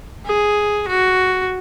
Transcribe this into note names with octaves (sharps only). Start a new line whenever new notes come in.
G#4
F#4